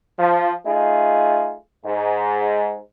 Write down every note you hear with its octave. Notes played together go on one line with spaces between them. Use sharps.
F3
A3 D#4 F4 G#4
G#2